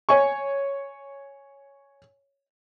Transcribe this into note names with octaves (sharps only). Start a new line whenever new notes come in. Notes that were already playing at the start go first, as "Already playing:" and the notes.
C#5 G#5 C#6